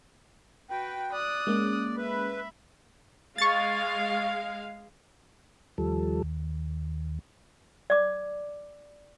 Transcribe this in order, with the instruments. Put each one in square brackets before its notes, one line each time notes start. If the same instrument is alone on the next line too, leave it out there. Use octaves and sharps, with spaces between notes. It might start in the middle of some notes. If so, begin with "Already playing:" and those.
[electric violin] F#4 B4 [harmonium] G5
[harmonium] D5 [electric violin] D#6 F#6
[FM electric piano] G#3 A#3 C#4
[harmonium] B4 [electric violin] E5 B5
[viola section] G#3 F5 [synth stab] C#6 A6
[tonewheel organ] D#2 F3 G3 A4
D#2
[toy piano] D5 D6